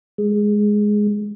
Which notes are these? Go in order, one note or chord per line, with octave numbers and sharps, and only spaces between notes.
G#3